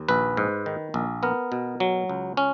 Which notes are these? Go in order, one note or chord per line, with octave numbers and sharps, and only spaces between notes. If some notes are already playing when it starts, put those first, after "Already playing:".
Already playing: D#2
A#1 B4
G#2
D#3
A#1
B3 A#4
B2
F#3
C#2
C#4